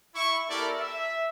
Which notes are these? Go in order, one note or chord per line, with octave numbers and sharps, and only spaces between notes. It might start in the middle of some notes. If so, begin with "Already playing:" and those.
E4 C#6
B3 E4 G4 A4 A#4 D5
E5